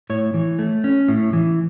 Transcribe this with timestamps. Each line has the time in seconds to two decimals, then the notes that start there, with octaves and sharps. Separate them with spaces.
0.10 A2 C#5
0.34 E3
0.59 A3
0.84 C#4
1.08 A2
1.33 E3